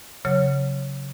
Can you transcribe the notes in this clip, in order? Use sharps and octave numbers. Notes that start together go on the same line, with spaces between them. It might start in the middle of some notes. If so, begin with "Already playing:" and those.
C#3 F#3 C#5